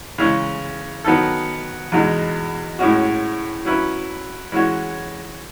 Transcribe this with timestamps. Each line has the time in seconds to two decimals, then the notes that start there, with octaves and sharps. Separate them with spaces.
0.18 C#3 E3 G#3 C#4
1.04 D#3 F#3 B3 D#4 A4
1.92 E2 B2 G#3 D#4
2.79 A2 G#3 C#4 F#4
3.65 F#3 C#4 E4 B4
4.52 E3 G#3 C#4 F#4 C#5